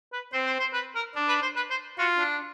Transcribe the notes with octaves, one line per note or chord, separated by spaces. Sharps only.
B4
C4 C5
C5
C5
B4
A#4
D4
B4
C5
B4
C5
F4 F#4
D4